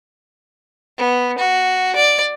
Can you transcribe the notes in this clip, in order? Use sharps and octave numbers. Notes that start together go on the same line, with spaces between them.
B3
F#4
D5